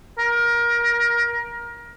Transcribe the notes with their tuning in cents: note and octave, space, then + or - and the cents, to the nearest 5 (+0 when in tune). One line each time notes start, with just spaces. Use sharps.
A#4 +25